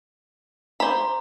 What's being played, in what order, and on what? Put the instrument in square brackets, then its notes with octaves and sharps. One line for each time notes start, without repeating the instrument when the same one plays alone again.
[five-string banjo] C5 B5 [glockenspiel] A#5 D6